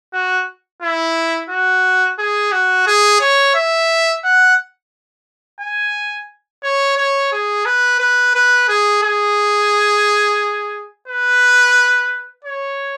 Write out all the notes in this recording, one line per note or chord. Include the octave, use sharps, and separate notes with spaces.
F#4
E4
F#4
G#4
F#4
G#4
C#5
E5
F#5
G#5
C#5
C#5
G#4
B4
B4
B4
G#4
G#4
B4
C#5